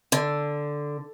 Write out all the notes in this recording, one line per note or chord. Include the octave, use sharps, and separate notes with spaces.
D3